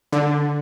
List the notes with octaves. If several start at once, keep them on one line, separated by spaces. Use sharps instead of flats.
D3